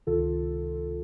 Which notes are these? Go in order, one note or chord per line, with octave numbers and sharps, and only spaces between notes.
C#2 C3 D#3 F4 A4